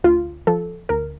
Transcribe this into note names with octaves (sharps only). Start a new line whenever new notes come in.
D2 F4
F3 A4
D2 A#4